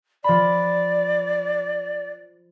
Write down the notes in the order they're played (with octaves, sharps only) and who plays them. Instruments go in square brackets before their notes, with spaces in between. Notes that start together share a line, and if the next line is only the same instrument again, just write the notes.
[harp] F3 B5 [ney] D5